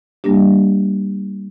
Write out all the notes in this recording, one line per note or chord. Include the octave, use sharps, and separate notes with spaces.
G3 A#3 D4 G4